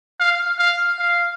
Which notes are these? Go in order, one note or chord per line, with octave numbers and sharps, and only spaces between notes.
F5
F5
F5